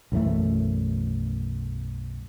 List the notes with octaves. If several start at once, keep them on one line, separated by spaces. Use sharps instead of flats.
B1 F#2 E3 A3